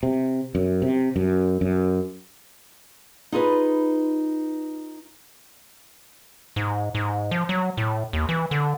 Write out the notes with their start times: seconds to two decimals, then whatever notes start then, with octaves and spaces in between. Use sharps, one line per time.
0.03 C3
0.55 F#2
0.82 C3
1.16 F#2
1.61 F#2
3.32 D#4 F4 G#4 B4
6.56 G#2
6.95 G#2
7.31 F3
7.49 F#3
7.77 A2
8.13 D#2
8.29 E3
8.51 D3